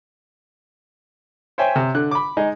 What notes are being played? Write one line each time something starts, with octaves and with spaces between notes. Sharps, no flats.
C5 C#5 E5 G5 G#5
C3
D3 F#6
B5 D6
G#3 D#4 G#4